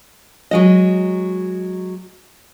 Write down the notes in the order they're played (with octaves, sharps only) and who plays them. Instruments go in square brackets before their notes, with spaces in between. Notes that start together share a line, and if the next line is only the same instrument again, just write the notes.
[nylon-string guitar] F#3 G#3 D#5